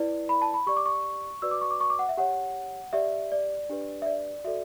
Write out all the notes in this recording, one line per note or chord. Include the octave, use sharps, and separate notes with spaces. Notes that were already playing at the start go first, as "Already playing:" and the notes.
Already playing: E4 B4 D5
B5
A5
B5
G4 D5 C#6
D6
C#6
F#4 B4 D5 E6
D6
C#6
D6
C#6
D6
F#5
E5
G4 C#5 F#5
G4 D5 E5
D5
D4 G4 B4
E5
D5
F#4 A4 D5 E5